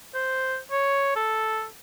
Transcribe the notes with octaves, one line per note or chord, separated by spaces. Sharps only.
C5
C#5
A4